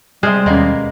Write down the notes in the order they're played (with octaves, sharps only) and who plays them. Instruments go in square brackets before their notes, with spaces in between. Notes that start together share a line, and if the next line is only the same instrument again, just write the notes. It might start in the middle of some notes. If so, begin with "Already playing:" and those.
[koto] C3 C5 [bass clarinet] G3 [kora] G#3 [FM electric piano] D#6 F6
[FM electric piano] D#2 C#4 [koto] B2 A#3